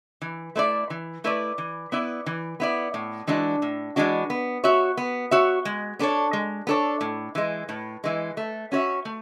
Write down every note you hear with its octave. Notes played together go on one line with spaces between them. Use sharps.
E3
A3 E4 B4 D5
E3
A3 E4 B4 D5
E3
B3 E4 B4 D5
E3
B3 E4 B4 D5
A2
E3 G#3 D4 F#4
A2
E3 G#3 D4 F#4
B3
F#4 C#5 E5
B3
F#4 C#5 E5
G#3
B3 D4 A4 C#5
G#3
B3 D4 A4 C#5
A2
E3 G#3
A2
E3 G#3
A3
C#4 F#4 C#5 E5
A3